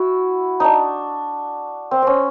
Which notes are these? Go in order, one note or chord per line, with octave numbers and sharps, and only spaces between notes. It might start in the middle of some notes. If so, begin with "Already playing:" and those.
Already playing: E4 F#4
D4 D#4
C4
C4 C#4